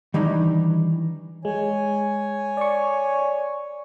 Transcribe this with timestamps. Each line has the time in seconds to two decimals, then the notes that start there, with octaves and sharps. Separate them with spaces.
0.14 D#3 E3 G3 D4 D#4
1.45 G#3 C#5 G#5
2.57 D5 C#6